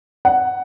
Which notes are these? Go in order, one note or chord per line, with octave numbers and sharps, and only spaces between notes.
F#5